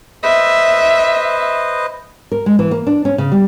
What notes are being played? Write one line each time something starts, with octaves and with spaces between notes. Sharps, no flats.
B4 C5 D#5 E5
A#4
G#3
E3
A#3
D4
C#4
C#3
G3